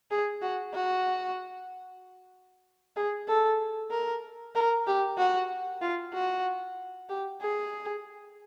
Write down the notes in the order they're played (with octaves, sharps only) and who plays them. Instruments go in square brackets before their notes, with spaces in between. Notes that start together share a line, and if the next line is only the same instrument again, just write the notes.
[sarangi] G#4
F#4
F#4
G#4
A4
A#4
A#4
G4
F#4
F4
F#4
G4
G#4